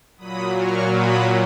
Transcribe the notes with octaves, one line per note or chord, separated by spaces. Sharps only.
A#2 F#3 B5 D#6
C#6 F6
B5 D#6